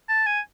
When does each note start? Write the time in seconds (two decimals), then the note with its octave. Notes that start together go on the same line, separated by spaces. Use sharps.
0.09 A5
0.26 G#5